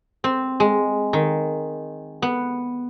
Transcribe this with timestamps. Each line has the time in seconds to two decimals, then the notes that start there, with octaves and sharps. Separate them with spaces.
0.24 C4
0.60 G#3
1.13 D#3
2.22 B3